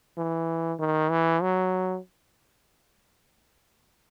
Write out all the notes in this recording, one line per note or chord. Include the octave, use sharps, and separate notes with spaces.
E3
D#3
E3
F#3